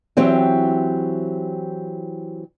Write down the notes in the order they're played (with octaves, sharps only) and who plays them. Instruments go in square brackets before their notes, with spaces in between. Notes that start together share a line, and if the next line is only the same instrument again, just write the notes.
[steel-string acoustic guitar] E3 F#3 C4 G4